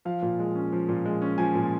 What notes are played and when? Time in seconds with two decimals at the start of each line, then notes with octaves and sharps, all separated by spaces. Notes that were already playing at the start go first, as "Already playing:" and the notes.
0.05 F3 F5
0.22 A#2
0.39 G#3
0.55 C#4
0.72 F3
0.89 A#2
1.05 G#3
1.22 C#4
1.38 F3 G#5
1.55 A#2